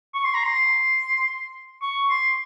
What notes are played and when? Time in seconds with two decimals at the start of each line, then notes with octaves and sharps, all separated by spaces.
0.14 C#6
0.24 C6
0.34 A#5
0.44 C6
1.82 C#6
2.10 C6